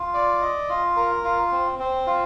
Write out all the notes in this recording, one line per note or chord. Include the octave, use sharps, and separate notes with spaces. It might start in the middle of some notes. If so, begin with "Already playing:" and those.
Already playing: F4
D5
D#5
F4
A#4
F4
C4
C4
F4